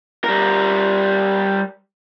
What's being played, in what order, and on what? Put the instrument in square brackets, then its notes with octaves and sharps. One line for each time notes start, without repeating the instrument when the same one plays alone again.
[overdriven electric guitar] G3 A#4